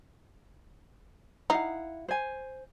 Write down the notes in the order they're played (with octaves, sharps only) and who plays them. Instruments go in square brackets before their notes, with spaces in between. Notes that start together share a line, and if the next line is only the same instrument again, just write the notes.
[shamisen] D#4 [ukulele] E4 F5 F#5
[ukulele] C5 G#5